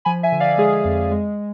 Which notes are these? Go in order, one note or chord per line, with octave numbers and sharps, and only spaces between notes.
F3 G#5 B5
E5 G#5
D3
D5 F5
G#3 G#4
F2
G#3